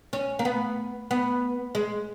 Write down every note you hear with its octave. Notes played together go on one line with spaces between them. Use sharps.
C#4
A#3
B3
B3
G#3